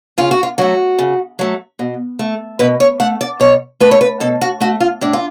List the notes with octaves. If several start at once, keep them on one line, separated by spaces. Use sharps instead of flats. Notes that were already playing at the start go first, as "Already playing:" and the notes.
C#3 F4
F#4
F4
F#3 A3 F#4
C#3
F#3 A3
B2
A3
B2 B4
C#5
A3 F#5
D5
B2 C#5
A3 B4
C#5
B4
B2 A4
F#4
A3 F#4
F4
A2 D4
F4